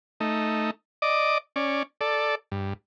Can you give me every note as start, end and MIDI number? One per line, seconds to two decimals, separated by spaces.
0.20 0.71 57
0.20 0.71 63
1.02 1.38 74
1.02 1.38 75
1.02 1.38 86
1.56 1.83 61
1.56 1.83 74
2.01 2.35 69
2.01 2.35 74
2.52 2.73 43